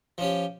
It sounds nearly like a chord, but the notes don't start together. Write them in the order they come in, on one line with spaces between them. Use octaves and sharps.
F3 C#4 G4